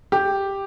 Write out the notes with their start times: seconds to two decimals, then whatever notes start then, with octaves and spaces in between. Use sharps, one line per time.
0.12 G4